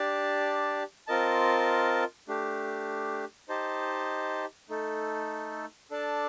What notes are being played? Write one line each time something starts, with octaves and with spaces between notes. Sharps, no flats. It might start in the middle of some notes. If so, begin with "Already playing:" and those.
Already playing: D4 G4 D5 A5
C4 F4 A#4 D#5 A5
A3 D4 G4
D#4 G4 C5 D#5 A5
A3 D#4 A4
D4 A4 D5 A5